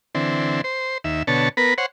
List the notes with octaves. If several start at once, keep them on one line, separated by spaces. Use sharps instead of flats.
D3 E3 C4
C5
D#2 E5
B2 D3 C#5 A5
B3 A#4 B4
C5 C#5 F#5